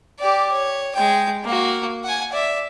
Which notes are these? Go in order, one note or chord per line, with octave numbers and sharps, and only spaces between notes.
G4 D5
C#5
G#3 G5
A#3 F#4
F#5 G#5
D5 E5